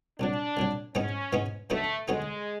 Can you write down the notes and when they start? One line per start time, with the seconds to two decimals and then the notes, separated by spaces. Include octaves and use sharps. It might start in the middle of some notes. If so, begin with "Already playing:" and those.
0.19 C2 A#2 F#3 D4
0.57 C2 A#2 F#3
0.95 G#2 E3 G#3 B3 C#4 D#4
1.33 G#2 E3 G#3 B3 D#4
1.70 D2 D3 F#3 A3 B3 D#4
2.08 D2 D3 F#3 G#3 B3 D#4